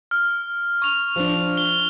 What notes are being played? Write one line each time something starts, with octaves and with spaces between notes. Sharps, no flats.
F6
C#6 F7
F3 D4
G7